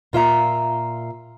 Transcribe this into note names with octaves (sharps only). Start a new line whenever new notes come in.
A#2 F4 E5 A#5